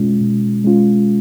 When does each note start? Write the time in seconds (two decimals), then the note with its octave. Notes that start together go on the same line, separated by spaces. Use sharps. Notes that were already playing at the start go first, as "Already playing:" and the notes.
Already playing: B2 G#3 C#4 F4
0.21 B2
0.64 G#3 C#4 F4